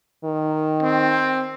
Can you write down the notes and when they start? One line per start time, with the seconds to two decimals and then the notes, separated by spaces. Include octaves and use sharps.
0.24 D#3
0.83 C4